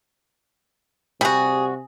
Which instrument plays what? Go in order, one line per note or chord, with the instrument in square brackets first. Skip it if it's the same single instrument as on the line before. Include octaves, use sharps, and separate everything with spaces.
[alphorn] C3 [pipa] G3 F#4 [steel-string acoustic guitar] G#4